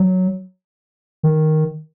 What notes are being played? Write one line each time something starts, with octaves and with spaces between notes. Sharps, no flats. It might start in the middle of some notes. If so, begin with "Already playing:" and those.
Already playing: F#3
D#3